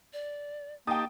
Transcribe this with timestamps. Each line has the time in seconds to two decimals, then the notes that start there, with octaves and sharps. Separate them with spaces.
0.13 D5
0.87 A#3 D#4 G4 G5 A5 D#6